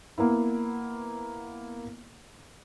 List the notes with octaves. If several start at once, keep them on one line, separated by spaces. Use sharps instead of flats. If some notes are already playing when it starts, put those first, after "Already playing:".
A#3 B3 E4